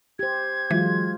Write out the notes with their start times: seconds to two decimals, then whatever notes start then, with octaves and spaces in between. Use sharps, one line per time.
0.19 G4 C5 G#6
0.71 E3 F#3 G#3 F4